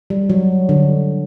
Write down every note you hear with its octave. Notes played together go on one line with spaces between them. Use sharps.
G3
F#3
D3